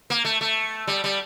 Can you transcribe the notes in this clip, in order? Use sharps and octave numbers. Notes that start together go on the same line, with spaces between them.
A#3
A3
A3
G3
G3